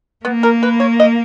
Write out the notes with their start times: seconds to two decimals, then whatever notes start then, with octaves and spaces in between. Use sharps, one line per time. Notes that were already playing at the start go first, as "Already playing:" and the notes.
0.25 A#3 B3
0.43 A#4
0.63 B4
0.80 C#5
1.00 D#5